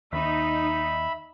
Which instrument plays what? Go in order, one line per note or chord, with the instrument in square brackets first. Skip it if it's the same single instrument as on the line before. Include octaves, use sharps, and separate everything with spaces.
[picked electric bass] D#2 [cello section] D#4 [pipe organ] E5 B5